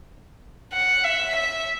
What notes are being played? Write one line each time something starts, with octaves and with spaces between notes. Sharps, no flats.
F#5
E5
E5